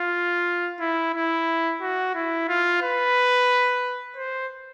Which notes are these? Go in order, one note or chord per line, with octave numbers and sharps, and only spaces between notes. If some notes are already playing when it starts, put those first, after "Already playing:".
Already playing: F4
E4
E4
F#4
E4
F4
B4
C5